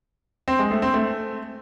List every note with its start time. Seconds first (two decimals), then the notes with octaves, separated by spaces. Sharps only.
0.48 C4
0.59 G#3
0.71 A3
0.82 C4
0.94 A3